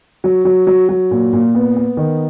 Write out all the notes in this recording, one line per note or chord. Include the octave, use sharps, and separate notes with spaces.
F#3
F#3
F#3
F#3
A#2
A#2
B3
B3
D#3